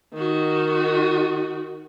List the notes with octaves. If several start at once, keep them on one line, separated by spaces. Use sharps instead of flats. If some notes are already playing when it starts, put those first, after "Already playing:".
D#3 F#4